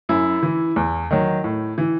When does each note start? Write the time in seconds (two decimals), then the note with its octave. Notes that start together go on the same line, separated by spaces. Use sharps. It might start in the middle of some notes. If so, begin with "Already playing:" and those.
0.09 F#2 E4
0.43 E3
0.76 E2
1.11 D#3 F#3
1.44 A2
1.78 E3